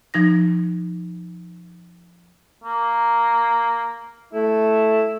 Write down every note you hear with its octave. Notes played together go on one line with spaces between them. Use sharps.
F3 D#4 A#6
A#3
A3 E4